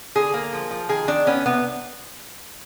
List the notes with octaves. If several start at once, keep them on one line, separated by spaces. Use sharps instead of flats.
D3 G#4
A#3
F3
F3
D#3 G#4
D#3 D4
B3 C#4
C3 B3